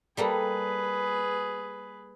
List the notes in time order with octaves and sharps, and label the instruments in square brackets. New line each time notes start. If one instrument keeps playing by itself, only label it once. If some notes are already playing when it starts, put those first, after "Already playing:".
[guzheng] G3 A#3 A4 [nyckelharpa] G#4 B4